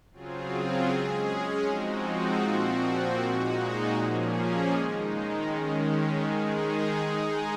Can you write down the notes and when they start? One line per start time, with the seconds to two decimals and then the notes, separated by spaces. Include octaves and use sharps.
0.13 C#3 F#3 C4 F4 G#4
0.89 G#3 C#4 G#4
1.66 F3 G#3 C4 D#4 F#4
2.42 A#2 F3 C4 F#4
3.18 A#2 G#3 D#4 F#4
3.94 A#2 F3 A#3 C#4 G#4
4.70 D#3 G#3 D#4
5.47 D#3 G#3 C#4
6.23 D#3 G#3 D#4 G#4
7.00 G#3 D#4 G#4